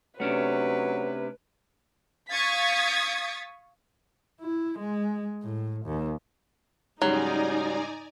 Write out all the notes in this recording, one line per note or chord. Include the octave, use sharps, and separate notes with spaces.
C3 F#3 A3 C#4 D4 B4
F5 C#6 D#6 G#6 A6 B6
E4
G#3
A2
D#2
G#2 C#3 F#3 G3 D#4 D5 G#5 A#5